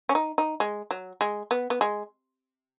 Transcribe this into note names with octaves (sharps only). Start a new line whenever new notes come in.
C#4
D#4
D#4
G#3
F#3
G#3
B3
B3
G#3